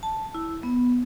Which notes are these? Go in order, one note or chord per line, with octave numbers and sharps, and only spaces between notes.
A5
E4
B3